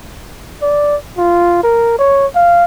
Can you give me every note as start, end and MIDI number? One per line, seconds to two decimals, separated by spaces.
0.62 0.96 74
1.18 1.63 65
1.63 1.96 70
1.99 2.27 73
2.35 2.65 77